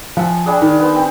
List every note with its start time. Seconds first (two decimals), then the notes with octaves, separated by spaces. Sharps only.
0.17 F3 E5 F#5 G#5
0.46 G3 D4 G#4
0.62 D#3
0.79 B3 C5
0.96 C4